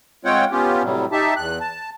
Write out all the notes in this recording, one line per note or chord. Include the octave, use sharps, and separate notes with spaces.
G#3 C4 F4 C#5 F#5 G5
B3 C#4 F4 G4
A2 C3 F#3 G3
D#4 G4 E5 A5
E2 F#6
A5